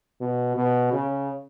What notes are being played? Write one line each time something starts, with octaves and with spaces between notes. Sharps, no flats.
B2
B2
C#3